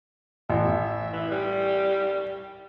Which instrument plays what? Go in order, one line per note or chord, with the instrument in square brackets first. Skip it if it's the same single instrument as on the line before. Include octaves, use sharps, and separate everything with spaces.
[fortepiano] A1 [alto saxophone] E5
[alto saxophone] E3
G3